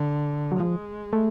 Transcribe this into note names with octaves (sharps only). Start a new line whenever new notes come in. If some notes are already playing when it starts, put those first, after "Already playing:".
Already playing: D3
F#3
F3 G#3
A3